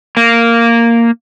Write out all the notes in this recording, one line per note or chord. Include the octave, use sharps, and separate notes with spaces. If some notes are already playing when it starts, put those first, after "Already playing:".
A#3